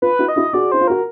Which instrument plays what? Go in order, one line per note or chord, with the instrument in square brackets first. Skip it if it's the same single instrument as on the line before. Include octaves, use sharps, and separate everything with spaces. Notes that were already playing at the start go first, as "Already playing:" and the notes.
[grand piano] F4 [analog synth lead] B4
[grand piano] E4 F#4
[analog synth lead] D#5
[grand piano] E4 F#4
[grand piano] F#4 G#4 [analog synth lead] D5
[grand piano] E4 [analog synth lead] C5
[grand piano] F4
[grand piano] F#4 [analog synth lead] A#4